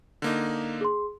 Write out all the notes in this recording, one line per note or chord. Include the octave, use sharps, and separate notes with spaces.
D3 A#3 D#4
G#4 C6